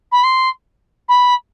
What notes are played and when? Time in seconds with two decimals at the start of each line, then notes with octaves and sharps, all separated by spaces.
0.12 B5
0.23 C6
1.08 B5